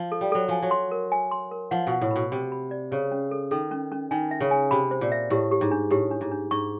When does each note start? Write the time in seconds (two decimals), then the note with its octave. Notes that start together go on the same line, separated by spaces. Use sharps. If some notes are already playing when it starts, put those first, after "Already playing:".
Already playing: F3
0.12 A4
0.21 G3
0.32 F#3 A4
0.48 F3 G#5
0.62 F#3
0.71 C6
0.91 A#4
1.12 G#5
1.31 C6
1.51 A#4
1.71 F3 F#5
1.87 B2 F#5
2.01 A2
2.11 B2 B5
2.32 C3 B5
2.52 B5
2.71 D5
2.91 C#3 C5
3.11 C#4
3.31 A4
3.51 D#3 A4
3.71 C#4
3.92 C#4
4.11 D#3 G#5
4.31 E5
4.41 C#3
4.51 G#5
4.71 C3 B5
4.91 C5
5.01 A#2
5.12 E5
5.30 A2 G4
5.51 G4
5.61 G#2
5.71 D4
5.91 A2 G4
6.11 D4
6.21 G#2
6.31 D4
6.51 G#2 C#6